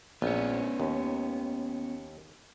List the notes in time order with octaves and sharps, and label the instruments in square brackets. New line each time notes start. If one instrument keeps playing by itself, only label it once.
[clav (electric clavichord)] A#1 [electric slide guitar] B3 C#4
[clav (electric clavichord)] D#2